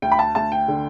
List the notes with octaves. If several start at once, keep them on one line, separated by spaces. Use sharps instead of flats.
D2 G5
B5
A5
D2 A5
G5
D3